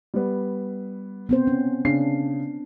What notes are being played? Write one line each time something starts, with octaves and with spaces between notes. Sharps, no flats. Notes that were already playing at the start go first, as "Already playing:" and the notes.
G3 B3
B3 C4 C5
C#4
C#3 C#4 D4 C7